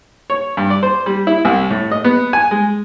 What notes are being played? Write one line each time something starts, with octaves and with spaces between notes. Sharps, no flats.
C#5
G2
D5
C5
G3
E4
C2
A2
D#5
B3
G#5
G#3